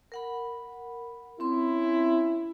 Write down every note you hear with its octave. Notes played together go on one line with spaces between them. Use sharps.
A#4 F#5 B5
C4 C#4 E4 C6